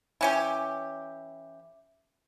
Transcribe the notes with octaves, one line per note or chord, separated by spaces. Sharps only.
E3 C#4 G4